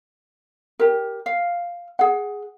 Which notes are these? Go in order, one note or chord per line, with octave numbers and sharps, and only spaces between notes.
G4 A#4
F5
G#4 F#5